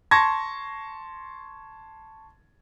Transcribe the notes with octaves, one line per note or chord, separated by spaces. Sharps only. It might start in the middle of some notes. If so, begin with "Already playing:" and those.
A5 C6 C#6 G#6 A#6